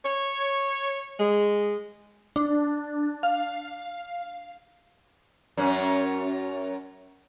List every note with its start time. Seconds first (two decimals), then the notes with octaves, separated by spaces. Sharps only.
0.05 C#5
1.20 G#3
2.36 D4
3.23 F5
5.57 F#2 C#4